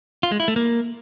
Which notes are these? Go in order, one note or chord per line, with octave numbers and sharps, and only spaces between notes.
F4
G#3
E4
A3
A#3